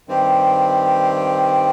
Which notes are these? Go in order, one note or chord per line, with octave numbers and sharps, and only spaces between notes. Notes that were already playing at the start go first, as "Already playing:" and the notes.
G2 D#3 G3 C4 G4